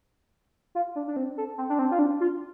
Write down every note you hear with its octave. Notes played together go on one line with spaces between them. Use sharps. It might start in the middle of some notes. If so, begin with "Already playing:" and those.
F4
D4
D4
C4
A4
C4
D4
C4
F4
D4
F4